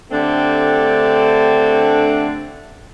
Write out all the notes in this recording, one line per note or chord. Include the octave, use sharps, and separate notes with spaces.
D3 A3 C4 D4 G4